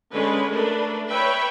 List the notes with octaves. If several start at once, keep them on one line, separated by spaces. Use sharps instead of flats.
D3 G#3 C#4 B4
A3 D4 A#4 B4
B4 C#5 E5 G5 B5